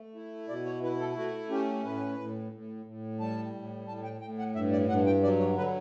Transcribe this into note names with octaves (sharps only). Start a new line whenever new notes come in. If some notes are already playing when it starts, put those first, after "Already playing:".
Already playing: A3
E4
B2 D5
C#5
E4 B4
A4
A3 F#4
C#4 G4
A2 B4
A2
A2
A2
G3 A5
A2
A2 A5
G5
A2 G5
F#5
G2 E5
D5
G2 F#5
G5
F#3 D5
C#5
D3 B4